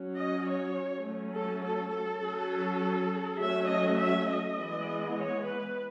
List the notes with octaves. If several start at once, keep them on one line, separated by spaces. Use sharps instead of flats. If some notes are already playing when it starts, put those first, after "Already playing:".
Already playing: F#3 C#4
D#5
C#5
F#3 A3 C#4
A4
A4
A4
F#3 C#4
F#3 A3 C#4 E5
D#5
E5
D#5
E3 G#3 B3
C#5
B4